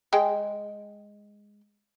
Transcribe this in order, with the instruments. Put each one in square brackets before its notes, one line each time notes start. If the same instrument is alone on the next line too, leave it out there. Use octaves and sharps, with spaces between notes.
[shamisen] G#3 G5